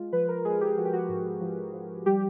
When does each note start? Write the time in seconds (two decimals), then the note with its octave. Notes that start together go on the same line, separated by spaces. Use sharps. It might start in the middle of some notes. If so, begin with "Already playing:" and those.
Already playing: G#3 F4
0.13 F3 B4
0.28 A#4
0.45 G#3 G#4
0.61 G4
0.77 F3 F#4
0.85 G4
0.93 F#4
1.09 G#2
1.41 F3
1.73 F3
2.06 G3 G4